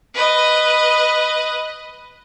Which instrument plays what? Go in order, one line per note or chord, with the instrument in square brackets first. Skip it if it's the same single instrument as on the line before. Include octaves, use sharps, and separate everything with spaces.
[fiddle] B4 D#5